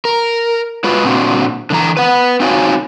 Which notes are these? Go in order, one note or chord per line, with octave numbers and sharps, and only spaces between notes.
A#4
G#3 F4 F#4 B4
A#2 C4 D4 F#4
D3 E3 A#5
B4 F#5
C4 D#4 F4 F#4 C#5 G#5